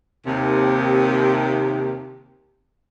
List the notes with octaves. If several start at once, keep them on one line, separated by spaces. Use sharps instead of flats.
D#2 C3